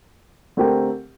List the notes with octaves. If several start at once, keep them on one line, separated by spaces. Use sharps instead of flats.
D3 A3 C4 G4 A#4